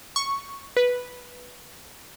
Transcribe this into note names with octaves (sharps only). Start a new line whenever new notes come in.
C#6
B4